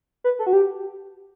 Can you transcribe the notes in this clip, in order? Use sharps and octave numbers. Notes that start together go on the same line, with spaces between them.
B4
A4
F#4
G4